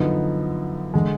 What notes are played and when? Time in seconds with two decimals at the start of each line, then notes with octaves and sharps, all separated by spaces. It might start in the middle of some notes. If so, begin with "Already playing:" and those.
Already playing: F#2 D3 F3 B3 D#4
0.94 D3 G#3